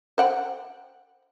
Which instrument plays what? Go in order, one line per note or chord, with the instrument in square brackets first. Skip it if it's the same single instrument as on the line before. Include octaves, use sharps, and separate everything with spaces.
[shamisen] C5 F#5 G5